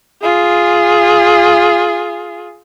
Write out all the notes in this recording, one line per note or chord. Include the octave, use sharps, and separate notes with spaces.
F4 G#4